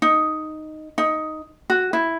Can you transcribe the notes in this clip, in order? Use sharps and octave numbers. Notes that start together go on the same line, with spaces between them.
D#4
D#4
F#4
E4